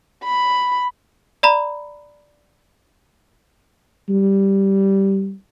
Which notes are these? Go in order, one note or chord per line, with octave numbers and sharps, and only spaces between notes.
B5
D5 A#5 B5
G3